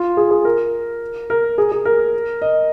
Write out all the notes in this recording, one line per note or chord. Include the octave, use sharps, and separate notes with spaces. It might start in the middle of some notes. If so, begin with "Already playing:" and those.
Already playing: F4
G#4
G#4
A#4
A#4
G#4
G#4
A#4
D#5